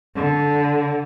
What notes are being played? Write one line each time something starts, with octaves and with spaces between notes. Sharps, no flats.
D3